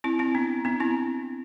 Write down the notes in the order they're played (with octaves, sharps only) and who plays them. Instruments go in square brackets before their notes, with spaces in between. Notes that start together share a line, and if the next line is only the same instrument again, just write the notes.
[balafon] C4 E4
C4 E4
B3 D4
B3 D4
C4 E4